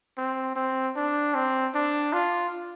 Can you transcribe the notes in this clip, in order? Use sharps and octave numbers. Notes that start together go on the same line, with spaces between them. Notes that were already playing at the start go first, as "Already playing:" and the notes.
C4
C4
D4
C4
D4
F4